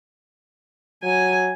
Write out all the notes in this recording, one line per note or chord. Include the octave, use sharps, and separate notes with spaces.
F#3 G#5